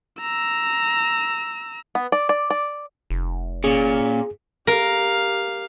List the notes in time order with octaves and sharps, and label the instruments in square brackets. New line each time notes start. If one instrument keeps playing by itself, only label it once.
[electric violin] A#5 E6
[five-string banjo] B3
D5
D5
D5
[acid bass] F1
[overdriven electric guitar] A#2 [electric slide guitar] C#4 [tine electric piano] G#4
[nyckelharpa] G4 F5 [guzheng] A#4